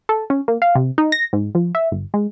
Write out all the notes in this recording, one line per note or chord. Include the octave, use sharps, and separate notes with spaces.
A4
C#4
A#3
F5
C3
D#4
A#6
G#2
F3
E5
G1
G#3